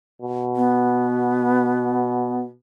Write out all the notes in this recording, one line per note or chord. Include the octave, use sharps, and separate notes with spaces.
B2
B3